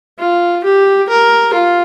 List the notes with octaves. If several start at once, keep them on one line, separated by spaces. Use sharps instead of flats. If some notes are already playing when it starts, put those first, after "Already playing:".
F4
G4
A#4
F4